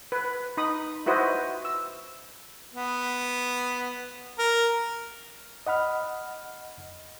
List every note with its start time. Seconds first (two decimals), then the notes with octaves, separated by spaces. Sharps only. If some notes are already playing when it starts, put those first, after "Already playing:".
0.12 B4
0.57 D#4 B5 D#6
1.06 E4 F#4 B4 C5 D#5
1.65 E6
2.74 B3
4.38 A#4
5.67 D#5 F#5 B5 F6